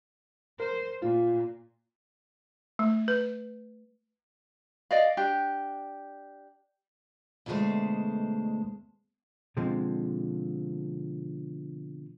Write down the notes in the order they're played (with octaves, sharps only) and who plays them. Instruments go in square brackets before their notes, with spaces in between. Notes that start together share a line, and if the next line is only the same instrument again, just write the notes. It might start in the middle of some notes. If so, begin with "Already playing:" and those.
[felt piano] A#4 [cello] C5
[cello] A#2 [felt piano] F4
[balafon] A3
B4
[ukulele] D5 D#5 F5
D4 G4
[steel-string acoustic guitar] D2 B2 E3 G#3 A3 C5
[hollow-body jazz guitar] B2 D3 F3 G#3 C4